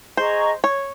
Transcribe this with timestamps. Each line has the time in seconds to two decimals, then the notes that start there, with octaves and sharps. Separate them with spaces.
0.17 G#4 C5 D#5 A#5 C#6
0.64 C#5